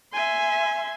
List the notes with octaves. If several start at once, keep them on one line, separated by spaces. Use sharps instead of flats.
E5 G#5 C6